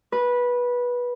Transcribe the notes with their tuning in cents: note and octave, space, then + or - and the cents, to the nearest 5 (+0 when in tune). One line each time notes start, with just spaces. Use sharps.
B4 -15